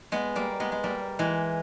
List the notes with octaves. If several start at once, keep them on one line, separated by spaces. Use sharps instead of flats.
G#3 B3
G3 A#3
G#3 B3
G#3
G3 A#3
E3 G#3